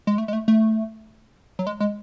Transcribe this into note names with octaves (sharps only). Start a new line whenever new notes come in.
G#3
A3
G#3
A3
A3
F#3
G#3
G#3